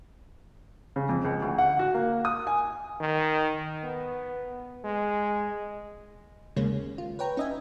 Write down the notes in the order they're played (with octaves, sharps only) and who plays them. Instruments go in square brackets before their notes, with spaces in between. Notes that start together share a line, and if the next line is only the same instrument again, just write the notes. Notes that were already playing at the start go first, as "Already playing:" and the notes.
[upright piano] C#3
F2
C#2
D2
F#5
F#4
A#3
D#6
G#5
[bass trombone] D#3
B3
G#3
[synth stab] D#2 C#3 G#3 A#3 C#4
F4
B4 C#5 G5 A#5
C#4 D#4 D#5 E5 G#5